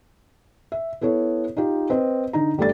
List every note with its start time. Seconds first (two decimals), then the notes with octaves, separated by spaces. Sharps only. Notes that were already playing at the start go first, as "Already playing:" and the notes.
0.72 E5
1.01 B3 E4 A4 C#5
1.57 D#4 F4 G4
1.90 C4 B4 D#5
2.33 D3 D#4 A#5
2.58 G1 G3 A3 A4 D5 A6